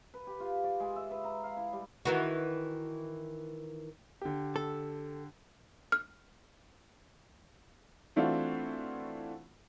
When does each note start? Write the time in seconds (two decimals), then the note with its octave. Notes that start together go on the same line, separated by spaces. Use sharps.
0.14 B4
0.27 G4
0.40 F4
0.64 D5
0.80 G#3
0.96 E5
1.11 B4
1.24 A#5
1.43 F5
1.57 E4
1.73 G3
2.05 D#3 E3 F#4
4.22 D3 G4
4.56 A4
5.92 F6
8.16 E3 A3 C4 D4 F4 F#4